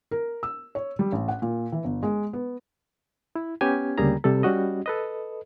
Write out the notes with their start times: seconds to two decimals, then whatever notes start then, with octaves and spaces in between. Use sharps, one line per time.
0.11 A#4
0.43 E6
0.75 C#5
0.99 G3
1.12 A1
1.28 F#5
1.42 A#2
1.72 E3
1.84 G1
2.03 G#3
2.33 B3
3.36 E4
3.61 B3 C#4 G4 G#5
3.98 D2 C#3 G3 A#3 G#4 A#5
4.24 C3 G3 A4
4.43 G3 C#4 F#4 D#5
4.86 A4 B4 D#5